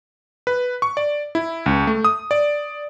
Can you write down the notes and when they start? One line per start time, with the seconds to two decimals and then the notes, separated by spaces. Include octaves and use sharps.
0.47 B4
0.82 C#6
0.97 D5
1.35 E4
1.66 C#2
1.87 A3
2.04 D#6
2.31 D5